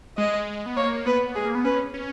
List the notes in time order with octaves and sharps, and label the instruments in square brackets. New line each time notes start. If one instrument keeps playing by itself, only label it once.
[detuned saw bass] G#3 [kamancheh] D#5
[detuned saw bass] B3
[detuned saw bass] A#3 [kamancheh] C#5
[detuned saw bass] B3 [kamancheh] B4
[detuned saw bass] G#3 [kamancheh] G#4
[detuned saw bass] A#3
B3
[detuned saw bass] C#4 [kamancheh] B4
[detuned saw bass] C#4